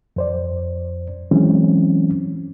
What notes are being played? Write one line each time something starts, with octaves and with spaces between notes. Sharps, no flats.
F2 C5 D5
E3 F#3 G#3 C4 C#4